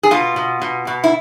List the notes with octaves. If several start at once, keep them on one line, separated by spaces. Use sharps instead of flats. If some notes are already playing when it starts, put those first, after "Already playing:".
G#4
B2 F4
B2
B2
B2
E4